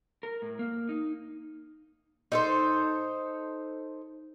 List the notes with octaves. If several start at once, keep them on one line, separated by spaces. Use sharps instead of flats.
A#4
A2
A#3
D#4
D#4 A4 C5